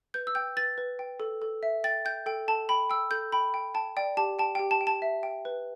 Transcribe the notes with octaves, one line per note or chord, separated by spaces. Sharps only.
B4 G6
E6
G5 G6
B4 A6
B4
G5
A4
A4
E5
G5 A6
G5 G6
A4 G5
A4 A5
G5 B5
G5 E6
A4 G6
G5 B5
G5
G5 A5
D5 G5
G4 A5
G5 A5
G5
G4
A5
G5
A5
E5
G5
B4